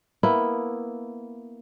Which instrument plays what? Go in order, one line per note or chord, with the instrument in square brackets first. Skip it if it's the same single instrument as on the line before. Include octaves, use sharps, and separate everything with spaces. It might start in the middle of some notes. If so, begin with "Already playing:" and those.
[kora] A#3 B3 E4